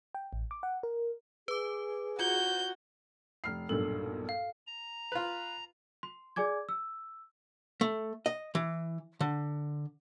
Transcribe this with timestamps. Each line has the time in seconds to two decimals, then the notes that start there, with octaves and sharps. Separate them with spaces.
0.15 G5
0.33 A1
0.51 D6
0.63 F#5
0.83 A#4
1.48 G#4 B4 D6
2.19 F4 F#4 G6
3.44 F1 F6 C7
3.69 B1 G2 A#2 A4
4.29 F5
4.67 A#5
5.12 F4 B4
6.03 C6
6.36 G#4 D5 G#5 D6 G#6
6.69 E6
7.81 A3
8.26 D#5
8.55 E3
9.21 D3